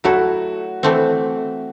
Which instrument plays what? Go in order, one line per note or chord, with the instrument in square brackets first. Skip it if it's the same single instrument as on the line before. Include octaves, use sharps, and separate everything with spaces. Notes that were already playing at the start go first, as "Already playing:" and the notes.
[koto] F#3 A3 E4 A4 [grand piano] F#4
[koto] E3 A3 C4